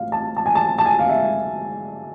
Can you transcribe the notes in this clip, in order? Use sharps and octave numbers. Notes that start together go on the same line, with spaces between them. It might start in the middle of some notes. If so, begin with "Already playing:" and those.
Already playing: A1 A2 F5
A5
A5
G#5
A5
A5
G#5
F5
E5